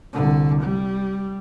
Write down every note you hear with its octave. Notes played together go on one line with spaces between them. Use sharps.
C2 D3
G3